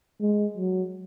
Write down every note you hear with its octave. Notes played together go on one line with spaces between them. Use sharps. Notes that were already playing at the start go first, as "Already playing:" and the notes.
G#3
F#3